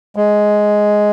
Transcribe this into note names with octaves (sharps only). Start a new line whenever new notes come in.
G#3